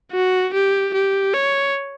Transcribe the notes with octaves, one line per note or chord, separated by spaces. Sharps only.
F#4
G4
G4
C#5